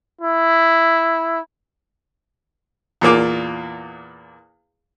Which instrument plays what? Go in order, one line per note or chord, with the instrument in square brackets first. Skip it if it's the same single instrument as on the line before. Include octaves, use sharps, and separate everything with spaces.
[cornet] E4
[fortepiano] E2 A#2 A#3 D6